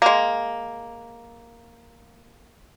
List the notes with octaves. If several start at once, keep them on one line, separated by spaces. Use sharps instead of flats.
G#3 A#3